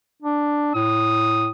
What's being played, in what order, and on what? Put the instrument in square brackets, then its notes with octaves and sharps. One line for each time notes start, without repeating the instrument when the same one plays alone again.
[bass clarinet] D4
[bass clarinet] A2 [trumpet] D#6